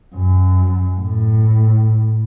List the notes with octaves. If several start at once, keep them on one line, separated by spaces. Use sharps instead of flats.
F#2
A2